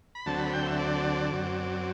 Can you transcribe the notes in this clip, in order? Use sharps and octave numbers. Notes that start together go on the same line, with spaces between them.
B5
D2 D3 F#3 C4 A5
B5
G5
E5
D5
F#2 F#3 C4